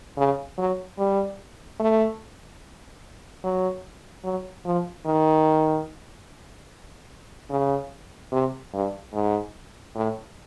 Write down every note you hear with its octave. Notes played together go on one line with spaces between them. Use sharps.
C#3
F#3
G3
A3
F#3
F#3
F3
D#3
C#3
C3
G2
G#2
A2